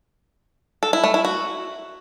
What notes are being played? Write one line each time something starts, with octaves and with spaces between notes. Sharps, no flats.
A4
E4
A3
E4
F#4